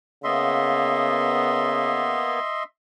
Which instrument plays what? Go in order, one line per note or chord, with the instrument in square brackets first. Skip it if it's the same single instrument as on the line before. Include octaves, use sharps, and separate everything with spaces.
[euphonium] C#3 [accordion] A#3 B3 [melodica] D#5 E5 C6